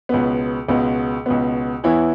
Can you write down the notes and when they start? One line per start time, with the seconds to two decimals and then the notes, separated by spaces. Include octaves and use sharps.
0.09 C#2 B2 B3
0.69 C#2 B2 B3
1.26 C#2 B2 B3
1.84 E2 E3 B3 E4 C#5